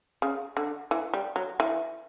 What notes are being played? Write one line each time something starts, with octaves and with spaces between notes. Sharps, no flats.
C#3
D3
E3
G3
F#3
E3